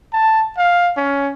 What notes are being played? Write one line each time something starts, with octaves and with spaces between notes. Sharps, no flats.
A5
F5
C#4